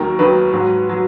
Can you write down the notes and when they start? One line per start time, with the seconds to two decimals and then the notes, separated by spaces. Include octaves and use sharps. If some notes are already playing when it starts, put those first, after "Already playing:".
Already playing: D#2 D#3 F#3 A#4
0.19 D#2 D#3 F#3 B4
0.53 G#2 F#3
0.89 F#3